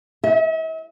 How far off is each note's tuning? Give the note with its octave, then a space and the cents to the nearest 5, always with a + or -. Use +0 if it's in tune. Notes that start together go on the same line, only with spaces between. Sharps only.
E5 -45